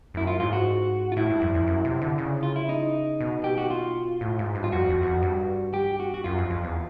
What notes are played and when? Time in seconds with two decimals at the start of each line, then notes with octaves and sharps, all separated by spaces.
0.14 F#2 E4
0.27 F4
0.40 G#2 F4
0.53 F#4
1.12 F4
1.17 A2 E4
1.30 G2
1.42 F2
1.54 F2
1.67 F#2
1.85 C3
2.02 D3
2.18 C#3
2.43 F4
2.56 E4
2.69 D#4
3.20 B2
3.44 G4
3.58 F#4
3.70 F4
4.21 A2
4.39 G#2
4.55 G2
4.64 F4
4.72 F2 F#4
4.89 F2
5.02 E2
5.06 F2
5.23 G2
5.74 G4
6.00 F#4
6.14 F#4
6.24 F#2 F4
6.38 F2
6.51 F2
6.64 E2